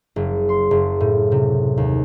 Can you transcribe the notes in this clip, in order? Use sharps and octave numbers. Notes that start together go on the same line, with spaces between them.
F#1
C6
F#1
A2
C3
D#2